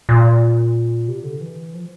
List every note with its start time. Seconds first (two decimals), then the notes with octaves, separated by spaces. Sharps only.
0.09 A#2
1.08 C3
1.24 D3
1.41 E3
1.74 F3